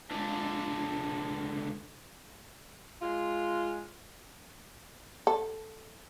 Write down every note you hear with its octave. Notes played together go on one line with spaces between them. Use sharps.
C#2 D3
G#3 F4
A4